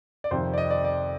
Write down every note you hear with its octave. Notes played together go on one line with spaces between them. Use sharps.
D5
F2 C3 D#3 C5
D5
D#5
D5
D5